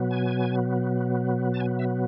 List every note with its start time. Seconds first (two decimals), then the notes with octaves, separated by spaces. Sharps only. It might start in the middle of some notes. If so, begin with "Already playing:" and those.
Already playing: B2 F#3 B3
0.11 G#5
1.54 A5
1.60 G#5
1.79 E5